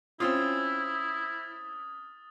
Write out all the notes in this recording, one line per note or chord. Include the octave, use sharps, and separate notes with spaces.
C4 C#4 E4 F4 D#6 F6 A6